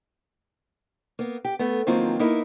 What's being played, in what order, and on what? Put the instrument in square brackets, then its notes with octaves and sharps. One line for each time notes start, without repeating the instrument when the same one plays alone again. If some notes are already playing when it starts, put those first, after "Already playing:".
[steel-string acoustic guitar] A#3 B3
G4
A3 B3
D#3 F3 F#3 A#3 C4 F4
A#3 B3 D#4 E4 A#4